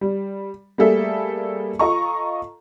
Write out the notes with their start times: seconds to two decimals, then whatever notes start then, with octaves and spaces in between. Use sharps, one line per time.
0.01 G3
0.78 G3 A3 A#3 G#4 A4 E5
1.79 F4 A4 D#5 A#5 C#6